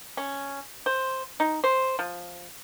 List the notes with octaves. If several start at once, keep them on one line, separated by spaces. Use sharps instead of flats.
C#4
C5
D#4
C5
F3